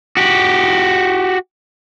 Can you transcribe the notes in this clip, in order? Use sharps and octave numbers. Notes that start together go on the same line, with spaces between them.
F#4 G4